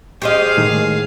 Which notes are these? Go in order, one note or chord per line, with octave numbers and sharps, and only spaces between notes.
G4 G#4 C5 D#5 F5
A2 D#3 G#3